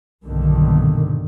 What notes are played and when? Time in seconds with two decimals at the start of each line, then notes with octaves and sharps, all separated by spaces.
0.24 B1 G2 A#2 D3 D#3